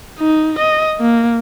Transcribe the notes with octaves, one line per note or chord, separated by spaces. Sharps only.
D#4
D#5
A#3